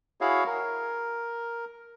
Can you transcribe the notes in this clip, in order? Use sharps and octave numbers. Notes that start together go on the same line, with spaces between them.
E4 F#4 G#4 C#5 F5
A#4